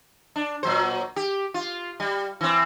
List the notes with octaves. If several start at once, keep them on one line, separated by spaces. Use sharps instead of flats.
D4
A#2 F#3 C5
G4
F4
G3
E3 C4